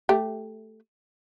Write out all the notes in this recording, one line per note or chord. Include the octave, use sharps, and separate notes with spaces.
A3 G4